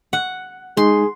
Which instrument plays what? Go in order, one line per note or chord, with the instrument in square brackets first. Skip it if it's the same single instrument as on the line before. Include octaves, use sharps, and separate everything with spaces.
[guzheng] F#5
[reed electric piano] G#3 D#4 [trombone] G#4 [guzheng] C6